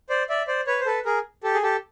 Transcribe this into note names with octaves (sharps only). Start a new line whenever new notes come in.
C5 D5
D5 E5
C5 D5
B4 C#5
C5
A4 B4
G#4 A#4
G4 A4
G#4
G4 A4